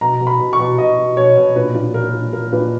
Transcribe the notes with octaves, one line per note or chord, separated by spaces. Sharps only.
B2 A#5
B2
B5
B2
C#6
B2
B2 D#5
B2
B2 C#5
B2
A#2 B4
A#2
A#2 A#4
A#2
A#2 A#4
A#2 B4